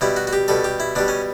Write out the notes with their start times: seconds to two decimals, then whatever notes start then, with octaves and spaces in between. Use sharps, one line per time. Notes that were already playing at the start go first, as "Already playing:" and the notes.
0.01 B2 G3 E4
0.17 F#4
0.27 F#4
0.33 G4
0.48 B2 G3 A4
0.64 G4
0.80 E4
0.95 B2 G3 D4
1.08 C#4